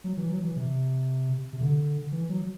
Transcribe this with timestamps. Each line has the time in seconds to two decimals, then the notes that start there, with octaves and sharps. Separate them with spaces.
0.04 F#3
0.17 E3
0.29 F#3
0.42 E3
0.56 C3
1.53 C3
1.61 D3
2.12 E3
2.29 F#3